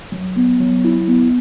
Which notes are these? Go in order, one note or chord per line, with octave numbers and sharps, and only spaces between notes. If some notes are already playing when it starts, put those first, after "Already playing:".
F#3
B3
F#3
E4
B3